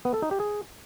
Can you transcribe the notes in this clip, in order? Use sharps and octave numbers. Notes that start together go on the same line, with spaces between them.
B3
A4
D#4
G4
G#4